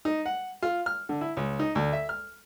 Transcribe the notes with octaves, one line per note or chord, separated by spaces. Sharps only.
D#4
F#5
F4
F6
D3
E4
C#2
D#4
D2
E5
F6